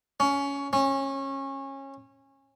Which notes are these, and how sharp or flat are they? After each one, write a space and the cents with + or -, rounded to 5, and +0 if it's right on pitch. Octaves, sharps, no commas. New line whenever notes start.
C#4 +15
C#4 -25